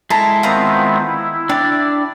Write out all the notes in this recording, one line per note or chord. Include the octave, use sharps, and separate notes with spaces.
G#3 E4 A4 A#5
D#3 B3 C4 F4 A#5 C6
E4
D4 G4 D5